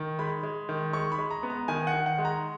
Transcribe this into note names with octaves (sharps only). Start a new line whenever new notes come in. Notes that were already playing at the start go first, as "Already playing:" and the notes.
Already playing: D#3
G#3 B5
G#3
D#3
G#3 C#6
B5
G#3
A#5
B3
A#5
D#3 G#5
F#5
D#3
F#5
G#3
A#5